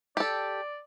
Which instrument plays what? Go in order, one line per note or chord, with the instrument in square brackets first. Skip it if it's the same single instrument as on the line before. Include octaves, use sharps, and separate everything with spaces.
[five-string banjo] G4 A4 [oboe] D5